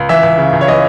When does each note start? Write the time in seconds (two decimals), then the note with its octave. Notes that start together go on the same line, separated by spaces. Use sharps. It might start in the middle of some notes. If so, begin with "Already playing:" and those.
Already playing: C#2
0.09 E3 E5
0.23 C#2
0.38 C#3
0.53 C#2
0.61 C#5
0.68 E3 D#5